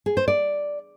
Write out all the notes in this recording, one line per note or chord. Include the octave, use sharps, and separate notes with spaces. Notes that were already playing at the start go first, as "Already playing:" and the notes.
G#4
C5
D5